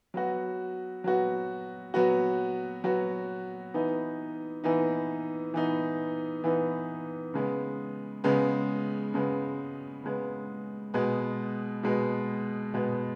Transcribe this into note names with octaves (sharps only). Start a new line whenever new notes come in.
F#3 B3 F#4
F#3 B3 F#4
F#3 B3 F#4
F#3 B3 F#4
E3 B3 D#4
E3 B3 D#4
E3 B3 D#4
E3 B3 D#4
C#3 G#3 B3
C#3 G#3 B3
C#3 G#3 B3
C#3 G#3 B3
B2 G#3 B3
B2 G#3 B3
B2 G#3 B3